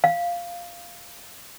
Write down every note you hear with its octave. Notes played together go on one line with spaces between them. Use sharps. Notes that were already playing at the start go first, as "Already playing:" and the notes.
F5